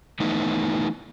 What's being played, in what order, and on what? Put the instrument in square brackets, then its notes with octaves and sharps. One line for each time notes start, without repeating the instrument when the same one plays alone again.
[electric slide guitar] E3 A3 B3 D#4 E4